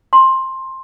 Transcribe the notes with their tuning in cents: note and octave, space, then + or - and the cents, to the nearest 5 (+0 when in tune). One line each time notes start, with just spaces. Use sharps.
A5 +45 C6 +15